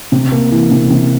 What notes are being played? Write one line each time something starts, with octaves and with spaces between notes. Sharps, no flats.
C3
A#3
E3
C3
C3